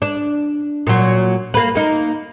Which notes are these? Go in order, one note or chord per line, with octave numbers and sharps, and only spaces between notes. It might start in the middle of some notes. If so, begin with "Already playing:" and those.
D4
A#2 F#3
A#3 B4
A#3 D#4